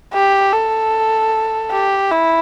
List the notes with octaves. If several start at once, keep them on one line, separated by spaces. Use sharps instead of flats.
G4
A4
G4
E4